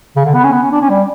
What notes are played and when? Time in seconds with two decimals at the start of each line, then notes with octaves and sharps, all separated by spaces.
0.16 C#3
0.25 D3
0.34 B3
0.44 C#4
0.53 B3
0.63 C#4
0.72 D4
0.81 C#4
0.89 G3